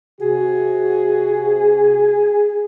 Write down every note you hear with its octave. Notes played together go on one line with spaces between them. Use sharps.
C3 F#4 G#4